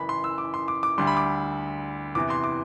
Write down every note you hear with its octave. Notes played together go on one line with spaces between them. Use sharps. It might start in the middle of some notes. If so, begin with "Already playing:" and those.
Already playing: F#1 F#2 E3 B5
C6
E6
D6
C6
D6
D6
D2 D3 G3 C6
B5
D6
E2 C3 E3 D6
C6
D6